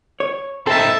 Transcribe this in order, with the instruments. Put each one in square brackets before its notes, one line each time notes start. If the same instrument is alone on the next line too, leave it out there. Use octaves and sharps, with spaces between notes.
[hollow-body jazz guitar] C#5
[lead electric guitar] C4 D#4 [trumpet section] E4 E5 A5 [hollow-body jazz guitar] A4